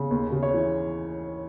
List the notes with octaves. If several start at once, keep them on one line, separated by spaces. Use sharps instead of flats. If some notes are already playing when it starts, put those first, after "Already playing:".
Already playing: C#3
D#2
C#3
C#5
E3